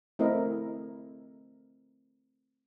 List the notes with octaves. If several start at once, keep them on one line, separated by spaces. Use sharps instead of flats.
A3 C4 E4 A#4 D#5